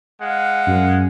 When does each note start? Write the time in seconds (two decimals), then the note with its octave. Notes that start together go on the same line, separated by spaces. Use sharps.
0.21 G#3 F5 F#5
0.66 F#2